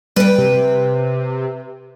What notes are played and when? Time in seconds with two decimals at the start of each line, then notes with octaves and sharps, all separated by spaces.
0.16 G3 B4 G5
0.38 C3